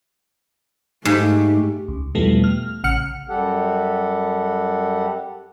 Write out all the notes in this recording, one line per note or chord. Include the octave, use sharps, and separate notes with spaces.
G#2 A3 G4
C#2
E2 B2 E3 F3 G3 A3
F6
A1 C#3 F#5 F6 C#7
F#2 G3 G4 A4 F#5